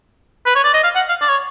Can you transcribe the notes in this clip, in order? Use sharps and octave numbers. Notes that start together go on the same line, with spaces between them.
B4
C#5
D5
D#5
F5
F#5
F5
D5
C#5